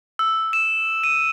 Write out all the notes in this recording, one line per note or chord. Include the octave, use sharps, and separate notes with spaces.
E6
E7
D#7